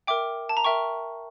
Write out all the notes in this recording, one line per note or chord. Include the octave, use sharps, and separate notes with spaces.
A#4 E5 G5 D6
A5
A#5
A#4 E5 G5 C#6